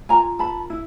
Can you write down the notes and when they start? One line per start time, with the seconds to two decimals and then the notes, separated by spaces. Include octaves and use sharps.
0.09 F4 A#4 G#5 A#5
0.39 A5 B5
0.70 E4